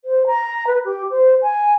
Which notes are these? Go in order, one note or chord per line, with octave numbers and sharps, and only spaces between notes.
C5
A#5
B4
G4
C5
G#5